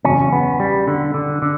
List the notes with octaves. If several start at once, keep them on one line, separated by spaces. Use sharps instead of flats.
E2 C#3 F#3 C#4
B3
G3
D3
D3
D3